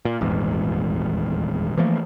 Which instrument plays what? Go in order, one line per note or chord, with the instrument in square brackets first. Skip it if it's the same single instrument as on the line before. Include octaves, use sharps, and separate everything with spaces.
[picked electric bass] A#2
D#1 G#1 E2 G#2
E3 F3 A3 A#3